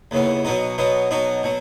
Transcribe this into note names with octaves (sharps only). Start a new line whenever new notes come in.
D#2 C#3 E3 B3
B2 F#3 B3 D#4
B2 F#3 B3 D#4
B2 F#3 B3 D#4
B2 F#3